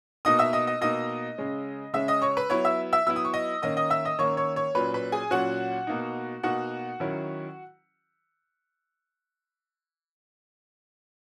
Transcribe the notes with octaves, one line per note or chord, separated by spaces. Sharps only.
B2 A#3 D#4 D#5 D#6
E5 E6
D#5 D#6
D#5 D#6
B2 A#3 D#4 D#5 D#6
C#3 G#3 C#4
C#3 G#3 C#4 E5 E6
D#5 D#6
C#5 C#6
B4 B5
F#3 B3 E4 C#5 C#6
E5 E6
E5 E6
F#3 B3 E4 E6
D#6
C#6
D#5 D#6
D#3 A#3 C#4 D#5 D#6
D#5 D#6
E5 E6
D#5 D#6
D#3 A#3 C#4 C#5 C#6
C#5 C#6
C#5 C#6
A#2 F#3 C#4 B4 B5
B4 B5
G#4 G#5
A#2 F#3 C#4 F#4 F#5
B2 A#3 D#4
B2 A#3 D#4 F#4 F#5
D#3 F#3 C#4 E4